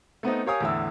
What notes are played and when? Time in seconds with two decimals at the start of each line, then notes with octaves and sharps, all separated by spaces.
0.23 A3 B3 C4 D#4
0.46 G4 A#4 C#5 F5 G#5 D#6
0.60 E2 A2 D3 E4 E6